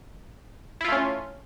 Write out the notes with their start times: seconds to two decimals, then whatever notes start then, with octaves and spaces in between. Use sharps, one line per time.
0.81 E4
0.84 F4
0.88 A3
0.92 C#4